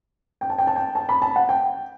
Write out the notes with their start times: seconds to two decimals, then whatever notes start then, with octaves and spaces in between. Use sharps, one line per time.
0.41 G5
0.50 A5
0.58 G5
0.67 A5
0.76 G5
0.95 A5
1.09 B5
1.22 A5
1.36 F#5
1.49 G5